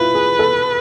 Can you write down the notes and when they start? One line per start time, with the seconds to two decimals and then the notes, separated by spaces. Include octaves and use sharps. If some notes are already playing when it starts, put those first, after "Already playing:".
Already playing: E4 F4 B4
0.15 G#4
0.39 A4